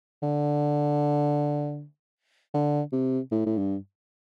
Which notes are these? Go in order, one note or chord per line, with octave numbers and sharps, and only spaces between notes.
D3
D3
C3
A2
A2
G2